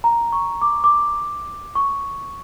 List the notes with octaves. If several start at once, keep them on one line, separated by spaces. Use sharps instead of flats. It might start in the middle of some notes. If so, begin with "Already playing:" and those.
A#5
C#6
D6
D6
C#6